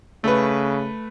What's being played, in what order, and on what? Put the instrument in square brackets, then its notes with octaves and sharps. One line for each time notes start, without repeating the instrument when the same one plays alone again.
[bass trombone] C#3 [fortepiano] A3 B4